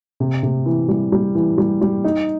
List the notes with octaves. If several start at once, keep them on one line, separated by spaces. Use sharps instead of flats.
C3
C3
E3
G3
G3
E3
G3
G3
D#4